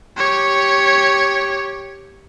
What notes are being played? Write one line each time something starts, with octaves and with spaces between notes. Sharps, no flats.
G4 C#5